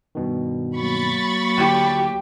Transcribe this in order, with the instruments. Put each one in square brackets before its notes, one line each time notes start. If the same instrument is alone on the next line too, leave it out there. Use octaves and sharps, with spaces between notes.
[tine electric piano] G2 B2 D#3
[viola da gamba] F#3 A#3 [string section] B5 C#6 A6
[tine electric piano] D2 [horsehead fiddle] G4